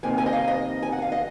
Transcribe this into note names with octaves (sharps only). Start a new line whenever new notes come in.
F2 C3 D#3 A#3 G#5
G#5
D#5
F5
D#5
G#5
F#5
F5
D#5